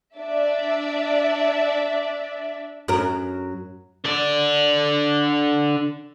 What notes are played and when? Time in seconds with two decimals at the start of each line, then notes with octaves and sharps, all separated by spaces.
0.16 D4 D5 E5
2.88 F#2 F#3 A#4
4.05 D3 D5